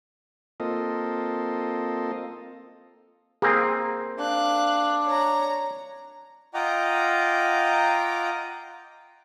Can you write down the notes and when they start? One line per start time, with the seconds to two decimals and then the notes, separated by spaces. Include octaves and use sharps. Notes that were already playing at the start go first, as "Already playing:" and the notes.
0.60 A#3 C4 F4 A4 D#5
3.42 A#3 C4 G#4
4.19 D4 F5 F#6
5.06 C#5 A#5
6.54 F4 D#5 F#5 G5 A#5 D6